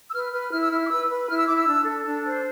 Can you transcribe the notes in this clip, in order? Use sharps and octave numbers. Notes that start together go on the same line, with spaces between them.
E6
B4 F6
B4 F6
E4 F6
E6
E4 F6
D6
B4 E6
B4
E4 F6
E6
E4 D6
E6
D4
A4
D4
C5